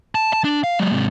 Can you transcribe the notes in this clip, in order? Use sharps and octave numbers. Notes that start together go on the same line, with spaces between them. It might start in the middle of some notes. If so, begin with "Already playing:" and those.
A5
A5
D4
F5
F#3 G#3
G#2 C3